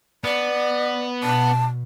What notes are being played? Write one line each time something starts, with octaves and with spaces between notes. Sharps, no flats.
B3 D5
B2 A5